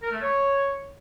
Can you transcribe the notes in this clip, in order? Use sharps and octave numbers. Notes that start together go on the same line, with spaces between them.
A#4
A3
C#5